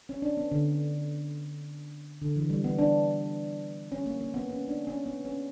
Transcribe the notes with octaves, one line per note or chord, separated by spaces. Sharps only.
C#4
D4
B3
D3
D3
E3
G3
B3
D4
C#4
A#3
A#3
B3
C#4
D4
C#4
B3
C#4